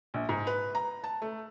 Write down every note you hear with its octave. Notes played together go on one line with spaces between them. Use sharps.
A#1
G#2
B4
A#5
A5
A3